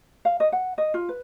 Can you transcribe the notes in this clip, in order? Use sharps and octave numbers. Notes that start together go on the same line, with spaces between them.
F5
D#5
F#5
D#5
F4
B4